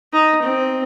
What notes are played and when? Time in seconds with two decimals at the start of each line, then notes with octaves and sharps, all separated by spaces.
0.13 D#4
0.41 C4